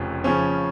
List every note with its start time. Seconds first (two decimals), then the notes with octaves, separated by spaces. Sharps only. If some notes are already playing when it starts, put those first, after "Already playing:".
Already playing: F1 F2 C#3 F3 C#4
0.24 C#3 F3 C#4